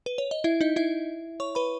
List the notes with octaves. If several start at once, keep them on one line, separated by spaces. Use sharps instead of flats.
B4
C#5
D#5
E4 E5
D#4 D#5
E4 E5
C#5 C#6
B4 B5